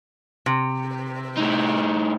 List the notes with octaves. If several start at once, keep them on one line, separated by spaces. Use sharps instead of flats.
C3
A2 D#4